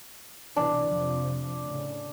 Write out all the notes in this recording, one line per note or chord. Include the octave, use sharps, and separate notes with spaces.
C2 B2 E3 D4
F2 C3 F3
A2 C#3